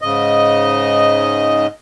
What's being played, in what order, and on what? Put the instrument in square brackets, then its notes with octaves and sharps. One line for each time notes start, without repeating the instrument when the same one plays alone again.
[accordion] G#2 C#3 D#5